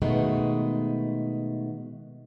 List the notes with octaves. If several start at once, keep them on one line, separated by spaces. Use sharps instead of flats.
B2 D#3 G#3 A3 B3